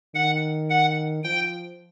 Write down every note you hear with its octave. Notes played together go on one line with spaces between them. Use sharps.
D#3 F#5
F#5
F3 G5